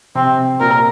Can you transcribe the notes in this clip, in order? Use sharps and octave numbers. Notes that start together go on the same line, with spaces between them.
C3 C4
C3
A#2 A#4